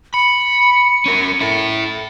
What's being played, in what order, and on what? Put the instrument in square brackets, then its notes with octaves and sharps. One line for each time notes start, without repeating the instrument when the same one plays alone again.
[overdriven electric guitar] B5 [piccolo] C#7
[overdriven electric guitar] C#4 A#4
E4 A4